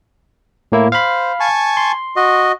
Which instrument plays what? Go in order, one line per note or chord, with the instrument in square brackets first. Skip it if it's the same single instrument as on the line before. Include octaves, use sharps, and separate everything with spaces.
[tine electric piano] A2 A#3 E4
[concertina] C5 [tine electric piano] F5 B5
[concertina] G#5 A5 C#6
[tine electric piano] C6
[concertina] F#4 D#5